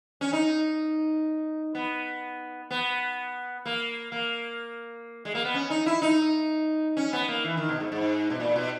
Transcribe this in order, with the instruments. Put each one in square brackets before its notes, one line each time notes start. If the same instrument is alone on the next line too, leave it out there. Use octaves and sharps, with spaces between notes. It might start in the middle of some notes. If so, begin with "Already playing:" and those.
[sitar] C#4
D#4
B3
B3
A#3
A#3
G#3
A#3
B3
C#4
D#4
E4
D#4
C#4
B3
A#3
E3
D#3
B2
G#2
G#2
B2
A#2
B2